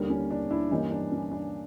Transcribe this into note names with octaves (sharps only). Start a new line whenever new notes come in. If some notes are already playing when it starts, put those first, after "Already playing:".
Already playing: D#2 D3 G3 A#3
C#4
D4
D4 E4
G2 E3 G3 A#3 C#4 D#4
D4
C#4
D4